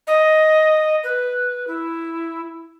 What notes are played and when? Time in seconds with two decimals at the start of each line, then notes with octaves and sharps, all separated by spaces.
0.07 D#5
1.04 B4
1.67 E4